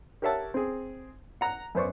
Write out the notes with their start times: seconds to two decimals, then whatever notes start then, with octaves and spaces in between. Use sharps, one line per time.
0.22 G4 A#4 C#5 E5 F#5 A5
0.54 C4 G#4
1.41 F#5 A#5
1.75 F#2 B3 C5 D5 C#6